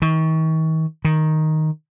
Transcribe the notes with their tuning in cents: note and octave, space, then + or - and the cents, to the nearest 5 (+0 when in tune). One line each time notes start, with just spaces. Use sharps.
D#3 +40
D#3 +5